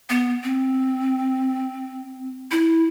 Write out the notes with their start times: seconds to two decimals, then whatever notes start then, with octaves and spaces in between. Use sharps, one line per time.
0.10 B3
0.44 C4
2.51 E4